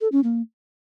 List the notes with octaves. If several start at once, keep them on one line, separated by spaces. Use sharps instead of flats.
A4
C#4
A#3